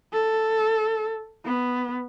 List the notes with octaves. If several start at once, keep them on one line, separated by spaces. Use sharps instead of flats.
A4
B3